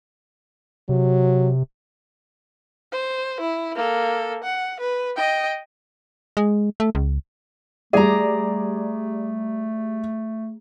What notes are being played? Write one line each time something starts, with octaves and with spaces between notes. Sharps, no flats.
C3 F#3
C5
E4
A#3 A4
F#5
B4
D#5 G5
G#3
A3
C#2
G3 A3 G#4 D5 A#5